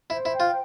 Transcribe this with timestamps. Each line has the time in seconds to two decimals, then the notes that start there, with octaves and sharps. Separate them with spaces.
0.10 E4 C5
0.25 E4
0.33 G5
0.40 F4